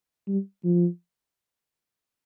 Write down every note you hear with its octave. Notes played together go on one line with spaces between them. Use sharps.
G3
F3